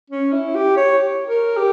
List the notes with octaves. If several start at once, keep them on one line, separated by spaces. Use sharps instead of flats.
C#4
E4
G4
C#5
A#4
G4